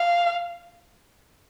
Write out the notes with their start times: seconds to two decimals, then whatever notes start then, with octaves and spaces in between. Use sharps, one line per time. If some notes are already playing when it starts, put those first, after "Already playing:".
Already playing: F5